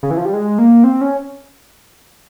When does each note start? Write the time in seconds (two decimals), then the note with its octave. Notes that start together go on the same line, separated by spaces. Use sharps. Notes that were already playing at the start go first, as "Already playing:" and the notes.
0.03 C#3
0.11 E3
0.17 F3
0.25 G3
0.33 G#3
0.59 A#3
0.84 C4
1.01 C#4